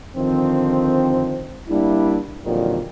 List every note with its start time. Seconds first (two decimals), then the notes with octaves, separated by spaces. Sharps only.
0.16 D3 D#3 F3 C4
1.69 G3 A#3 D4 E4
2.45 F2 A#2 D3 D#3 F#3 G3